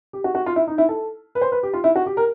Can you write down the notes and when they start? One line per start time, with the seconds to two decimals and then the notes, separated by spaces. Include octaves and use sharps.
0.13 G4
0.24 F#4
0.35 F#4
0.46 F4
0.56 E4
0.67 D#4
0.78 E4
0.89 A4
1.35 B4
1.42 C5
1.52 B4
1.63 G4
1.73 F4
1.84 E4
1.96 F#4
2.06 G4
2.17 A#4